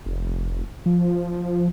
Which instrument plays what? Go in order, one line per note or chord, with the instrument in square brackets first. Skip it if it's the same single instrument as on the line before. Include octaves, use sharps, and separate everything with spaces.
[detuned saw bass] F1
F3